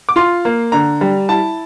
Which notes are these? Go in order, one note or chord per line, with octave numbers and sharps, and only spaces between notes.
D6
F4 C6
A#3
D3 A#5
G3
E4 A5